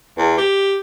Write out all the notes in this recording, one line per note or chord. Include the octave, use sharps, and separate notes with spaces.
E2
G4